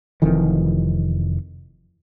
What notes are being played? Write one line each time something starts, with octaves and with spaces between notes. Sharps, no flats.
F1 F2 D#3 E3